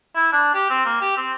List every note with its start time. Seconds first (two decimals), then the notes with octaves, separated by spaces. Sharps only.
0.15 E4
0.33 D4
0.54 G4
0.70 C4
0.85 A#3
1.01 G4
1.17 C4